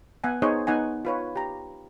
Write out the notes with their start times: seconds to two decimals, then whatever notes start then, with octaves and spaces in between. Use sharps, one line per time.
0.24 B3 F#5 G#5
0.42 B3 D#4 G#4 C5 C#5 D#5
0.67 B3 D#4 F#5 G#5
1.05 F4 B4 C#5
1.36 G4 A#5